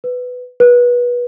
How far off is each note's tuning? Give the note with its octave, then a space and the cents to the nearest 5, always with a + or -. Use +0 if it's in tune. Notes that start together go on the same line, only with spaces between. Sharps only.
B4 +10
B4 -25